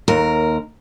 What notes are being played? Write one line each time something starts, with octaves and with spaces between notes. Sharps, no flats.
D#2 A#4